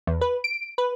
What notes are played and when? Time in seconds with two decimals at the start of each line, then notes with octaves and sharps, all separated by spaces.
0.07 E2
0.21 B4
0.44 D7
0.78 B4